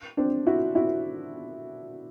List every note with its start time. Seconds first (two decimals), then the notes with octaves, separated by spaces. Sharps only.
0.17 C4 D4
0.47 E4 F#4
0.75 E4 F#4